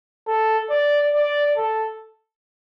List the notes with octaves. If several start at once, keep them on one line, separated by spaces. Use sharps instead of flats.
A4
D5
D5
A4